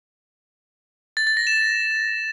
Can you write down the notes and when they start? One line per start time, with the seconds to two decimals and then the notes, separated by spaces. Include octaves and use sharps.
1.17 A6
1.27 A6
1.37 A#6
1.47 E7